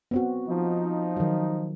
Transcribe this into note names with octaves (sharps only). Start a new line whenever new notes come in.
B3 C4 F#4
F3 D#4
D#3 F#3